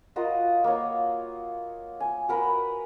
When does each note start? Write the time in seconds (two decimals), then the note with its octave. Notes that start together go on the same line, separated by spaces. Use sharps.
0.16 F4 F#4 A#4 D#5
0.64 A#3 C#5
2.00 G#5
2.29 F#4 A#4 B4